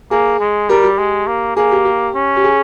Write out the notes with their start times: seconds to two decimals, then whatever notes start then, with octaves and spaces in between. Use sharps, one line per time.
0.11 A#3 G#4
0.40 G#3
0.69 G3 G4 A#4
0.84 G4
0.98 G#3
1.27 A#3
1.57 A#3 G#4
1.71 G4
1.85 G4
2.15 C#4
2.36 G4
2.44 G#4